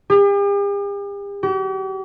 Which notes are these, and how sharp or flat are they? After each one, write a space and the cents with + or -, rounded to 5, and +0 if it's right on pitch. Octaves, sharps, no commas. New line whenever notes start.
G4 +45
G4 -45